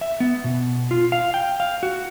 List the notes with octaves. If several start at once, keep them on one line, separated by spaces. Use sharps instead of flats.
E5
B3
B2
F4
F5
G5
F5
F#4